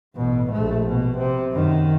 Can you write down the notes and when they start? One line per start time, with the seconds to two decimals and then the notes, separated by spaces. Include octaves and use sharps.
0.16 A1 B2
0.52 A#1 A3
0.87 B2
1.17 C3
1.51 F#2 D#3